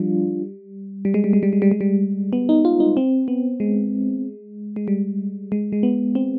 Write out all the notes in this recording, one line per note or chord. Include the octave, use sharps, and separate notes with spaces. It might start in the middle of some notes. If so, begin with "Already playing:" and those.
Already playing: F3 G3 D4 F4
G3
G#3
G3
G#3
G3
G#3
G3
G#3
G3
B3
D#4
F4
D#4
C4
B3
G#3
G#3
G3
G#3
G#3
B3
C4